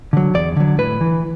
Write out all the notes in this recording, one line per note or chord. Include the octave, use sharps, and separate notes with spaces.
D3 F#3
E2 D5
D3 F#3
A2 B4
E3